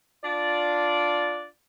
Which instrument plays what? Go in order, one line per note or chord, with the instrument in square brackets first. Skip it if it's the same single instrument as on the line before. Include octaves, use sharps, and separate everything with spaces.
[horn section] D4 F4 D5